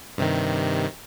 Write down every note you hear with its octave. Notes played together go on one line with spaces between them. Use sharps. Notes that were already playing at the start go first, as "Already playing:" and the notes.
G2 C3 D#3